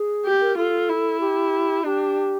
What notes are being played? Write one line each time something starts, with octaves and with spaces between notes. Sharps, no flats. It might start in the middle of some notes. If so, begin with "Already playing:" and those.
Already playing: G#4
G4
A#4
F4 A4
E4
G4
D4 G4